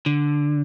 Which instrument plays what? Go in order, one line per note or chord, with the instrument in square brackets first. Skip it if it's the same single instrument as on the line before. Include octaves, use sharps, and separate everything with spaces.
[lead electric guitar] D3